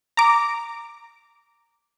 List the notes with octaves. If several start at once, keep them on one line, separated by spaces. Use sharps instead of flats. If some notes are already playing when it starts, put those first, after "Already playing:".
A#5 D6